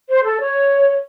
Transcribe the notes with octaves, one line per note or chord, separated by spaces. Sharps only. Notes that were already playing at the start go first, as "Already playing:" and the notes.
C5
A4
C#5